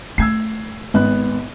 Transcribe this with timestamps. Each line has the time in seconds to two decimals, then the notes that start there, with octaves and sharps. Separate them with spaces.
0.18 A3 E6 G#6 C7
0.94 G#1 B3 F#6